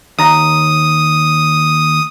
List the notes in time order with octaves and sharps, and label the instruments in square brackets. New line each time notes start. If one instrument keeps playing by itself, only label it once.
[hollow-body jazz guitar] D#2 A#5 [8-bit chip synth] D#6